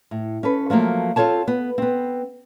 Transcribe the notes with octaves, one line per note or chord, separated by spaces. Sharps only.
A2
C#4 A4 B4
F3 F#3 A3 A#3
C4 F4 A4 C#5 A5
B3
B3 C4